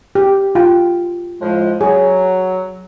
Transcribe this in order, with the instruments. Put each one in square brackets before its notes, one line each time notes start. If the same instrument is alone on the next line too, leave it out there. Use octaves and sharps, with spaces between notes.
[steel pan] G4
F4 G5
[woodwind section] A2 F3 G#3
[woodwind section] F#3 [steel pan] G#4